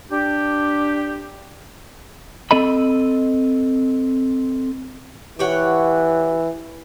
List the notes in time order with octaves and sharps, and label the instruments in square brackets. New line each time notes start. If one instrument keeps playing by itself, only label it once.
[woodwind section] D4 G4
[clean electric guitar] C4 A4 D#5 B5
[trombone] E3 [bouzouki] G4 C#5 F#5